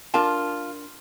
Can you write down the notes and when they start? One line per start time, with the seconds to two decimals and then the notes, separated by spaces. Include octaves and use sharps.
0.14 D4 F4 A#4 A5